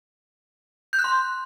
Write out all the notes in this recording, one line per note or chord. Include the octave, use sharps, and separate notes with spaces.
G6
F#6
C6